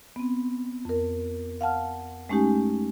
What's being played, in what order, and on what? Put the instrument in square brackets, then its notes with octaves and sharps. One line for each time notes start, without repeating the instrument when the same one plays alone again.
[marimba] B3 C4
F2 A#4
F5 F#5 A5 F6
G#3 A3 C#4 D#4 G4 G#5